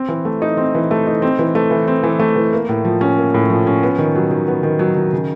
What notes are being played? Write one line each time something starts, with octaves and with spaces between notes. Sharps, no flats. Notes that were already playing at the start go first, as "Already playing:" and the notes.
Already playing: C4
E3
A3
D#4
C4
E3
A3
D#4
C4
E3
A3
E3
C4
E3
A3
E3
A#3
A2
F3
C#4
A#3
A2
F3
C#4
B3
D#3
F#3
D#3
B3
D#3
F#3
D#3
C#3